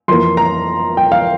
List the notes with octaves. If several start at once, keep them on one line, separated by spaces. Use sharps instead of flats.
F2 E3 A#3 C6
A#5
G5
F5